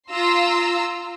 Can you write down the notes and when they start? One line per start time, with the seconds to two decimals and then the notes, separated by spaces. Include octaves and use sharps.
0.11 F4 A#5 C6 E6